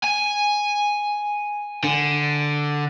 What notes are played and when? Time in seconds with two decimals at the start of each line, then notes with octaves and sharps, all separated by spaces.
0.04 G#5
1.84 D3